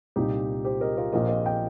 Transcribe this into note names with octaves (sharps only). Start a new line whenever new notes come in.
C2 A#2 D#4 G4
G4 C5
A#4 D#5
F4 A#4
A#1 A#2 A#4 D#5
A#4 D#5
D#5 G5